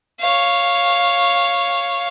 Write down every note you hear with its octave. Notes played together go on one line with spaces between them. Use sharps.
C#5 F5